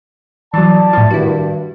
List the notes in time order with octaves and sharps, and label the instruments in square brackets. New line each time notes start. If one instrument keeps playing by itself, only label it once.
[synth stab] E3 F#3 [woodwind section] D5 A5
[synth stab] A2 F3
[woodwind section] G2 D#3 [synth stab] E4 F#4